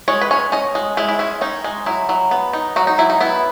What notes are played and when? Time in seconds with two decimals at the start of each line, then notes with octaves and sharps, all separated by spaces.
0.08 G#3 C#5
0.21 B4
0.31 C#4 C#5
0.52 C#4 D#5
0.75 G#3
0.97 G#3 E4
1.09 E4
1.19 C#4 E4
1.41 C#4 D#4
1.64 G#3
1.86 F#3 E4
2.09 F#3
2.31 B3
2.53 D#4
2.76 F#3 F#4
2.87 D#4
2.98 F#3 E4
3.10 D#4
3.21 B3 E4